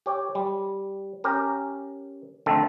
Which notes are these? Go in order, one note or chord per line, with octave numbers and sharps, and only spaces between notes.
G4 C#5 G5
G3
C#4 G4 A#4
D3 D#3 F3 A3 C4 A4